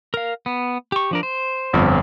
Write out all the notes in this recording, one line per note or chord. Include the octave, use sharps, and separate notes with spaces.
A#4 F5
B3
G4 C#6
F3 D4 A#4
C5
G1 F2